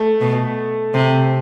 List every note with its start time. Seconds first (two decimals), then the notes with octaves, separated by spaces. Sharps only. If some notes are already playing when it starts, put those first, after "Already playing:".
Already playing: A3
0.21 B2
0.94 C3